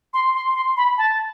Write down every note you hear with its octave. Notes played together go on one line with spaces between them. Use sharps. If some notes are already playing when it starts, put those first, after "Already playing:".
C6
C6
C6
B5
A5